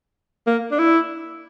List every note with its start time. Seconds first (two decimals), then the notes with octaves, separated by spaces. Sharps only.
0.47 A#3
0.72 D4
0.79 E4